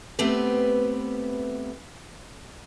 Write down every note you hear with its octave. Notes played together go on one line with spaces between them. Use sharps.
A3 B3 C4 G4 B4